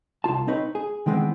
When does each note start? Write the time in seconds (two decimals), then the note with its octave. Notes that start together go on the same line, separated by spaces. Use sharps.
0.24 C2 G2 F4 A5
0.47 C4 D#4 B4 C#5
0.75 G#4
1.06 D#3 E3 G#3 A3 B3 C4